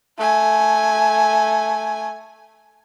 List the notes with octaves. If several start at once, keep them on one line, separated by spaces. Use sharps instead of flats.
A3 G#5